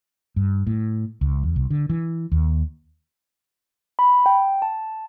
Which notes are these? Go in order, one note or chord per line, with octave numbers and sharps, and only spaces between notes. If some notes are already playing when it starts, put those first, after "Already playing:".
G2
A2
C#2
E2
C2
D3
E3
D#2
B5
G5
A5